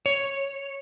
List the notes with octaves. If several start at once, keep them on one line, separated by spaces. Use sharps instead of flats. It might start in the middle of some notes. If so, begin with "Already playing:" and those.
C#5